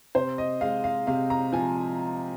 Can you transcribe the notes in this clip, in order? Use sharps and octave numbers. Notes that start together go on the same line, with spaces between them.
C3 C5
D#5
G#3 F5
F5
C3 F5
A#5
F3 G#5